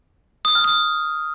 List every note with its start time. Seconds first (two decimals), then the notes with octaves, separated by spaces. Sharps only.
0.45 D#6
0.55 F6
0.64 D#6